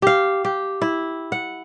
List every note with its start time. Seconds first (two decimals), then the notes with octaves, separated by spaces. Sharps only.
0.02 G4 F5
0.45 G4
0.82 E4
1.32 F#5